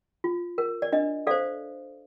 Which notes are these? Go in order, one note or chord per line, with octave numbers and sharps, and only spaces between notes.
F4
A#4
D5
D4 D#5
A4 C5 D5 F5